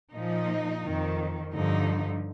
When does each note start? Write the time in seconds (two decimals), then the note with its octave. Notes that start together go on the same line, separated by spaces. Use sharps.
0.13 A#2 F3 D#4
0.83 F2 D#3
1.52 G2 D3 F3 D#4